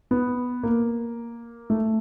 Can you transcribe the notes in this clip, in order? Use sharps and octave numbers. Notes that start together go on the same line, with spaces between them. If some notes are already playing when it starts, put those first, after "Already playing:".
B3
A#3
A3